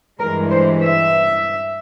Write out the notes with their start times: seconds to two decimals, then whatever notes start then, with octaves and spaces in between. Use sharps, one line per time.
0.19 G2 E3 G#3 A#4
0.50 C5
0.81 E5